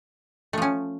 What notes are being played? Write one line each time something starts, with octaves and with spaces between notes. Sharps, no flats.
F3 A3 C#4